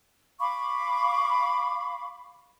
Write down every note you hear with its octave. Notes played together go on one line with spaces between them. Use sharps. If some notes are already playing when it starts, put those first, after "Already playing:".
F5 B5 C#6 D6